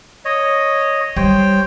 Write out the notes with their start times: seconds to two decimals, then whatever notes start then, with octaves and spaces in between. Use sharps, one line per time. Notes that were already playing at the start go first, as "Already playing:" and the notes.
0.25 C#5 D#5
1.16 G3 C5 C#5 G5